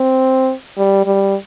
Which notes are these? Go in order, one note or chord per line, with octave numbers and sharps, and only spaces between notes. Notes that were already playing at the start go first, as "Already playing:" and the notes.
Already playing: C4
G3
G3